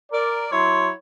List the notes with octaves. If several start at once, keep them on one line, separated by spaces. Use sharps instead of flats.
A#4 D5
F#3 E4 C#5 C6